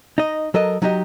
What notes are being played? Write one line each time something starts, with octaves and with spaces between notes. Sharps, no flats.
D#4 D#5
F#3 A4 A#4 D#5
F#3 D#4 F#4 G4 D#5